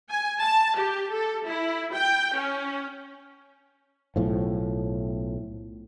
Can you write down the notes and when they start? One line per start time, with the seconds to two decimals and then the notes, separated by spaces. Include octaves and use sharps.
0.10 G#5
0.43 A5
0.78 G4
1.14 A4
1.47 E4
1.94 G5
2.37 C#4
4.16 B1 A2 F3